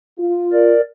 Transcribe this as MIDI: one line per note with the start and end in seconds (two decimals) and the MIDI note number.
0.18 0.72 65
0.52 0.81 70
0.52 0.81 74